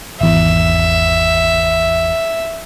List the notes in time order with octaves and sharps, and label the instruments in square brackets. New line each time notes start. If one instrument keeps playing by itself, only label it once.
[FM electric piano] G#1 E2 [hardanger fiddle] E5